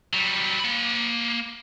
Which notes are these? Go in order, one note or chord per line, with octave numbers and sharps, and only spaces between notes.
F#3 G3
A#3 B5